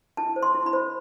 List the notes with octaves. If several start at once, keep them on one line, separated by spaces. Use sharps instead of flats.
E4 A5
C5
C6
E4
B5
C5